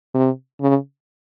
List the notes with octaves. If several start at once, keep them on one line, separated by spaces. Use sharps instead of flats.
C3
C#3